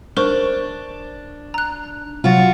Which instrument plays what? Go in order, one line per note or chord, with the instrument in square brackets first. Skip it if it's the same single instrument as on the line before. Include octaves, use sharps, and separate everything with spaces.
[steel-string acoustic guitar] D4 [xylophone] A#4 C5 C#6
[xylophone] A#5 F#6
[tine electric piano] C3 F#3 A6 [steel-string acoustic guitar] F4 F#4